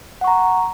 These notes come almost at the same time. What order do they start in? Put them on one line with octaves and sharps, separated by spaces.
F#5 C#6 A#5